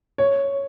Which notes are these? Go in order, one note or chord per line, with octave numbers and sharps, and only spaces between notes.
C#5